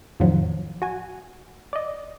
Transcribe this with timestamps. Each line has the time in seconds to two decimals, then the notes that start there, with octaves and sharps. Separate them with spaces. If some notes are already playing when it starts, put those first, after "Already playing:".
0.20 F2 A2 D#3 F3 F#3
0.82 F#4 G#5
1.73 D5 D#5